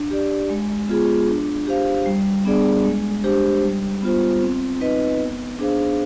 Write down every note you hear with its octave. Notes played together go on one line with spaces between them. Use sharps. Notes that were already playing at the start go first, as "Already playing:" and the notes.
Already playing: D4
G4 D5
G#3
B3 F4 G#4
D4
G4 C5 F5
G3
B3 D4 G#4 D5
G#3
D4 G4 C5
G3
B3 F4 C5
C4
D#4 B4 D#5
B3
D4 G#4 C5 F5